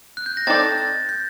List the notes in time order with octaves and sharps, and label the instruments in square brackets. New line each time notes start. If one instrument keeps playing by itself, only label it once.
[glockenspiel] F#6
G6
A#6
[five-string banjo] C4 D#4 A4 D5 [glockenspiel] A6
[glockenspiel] A6
G6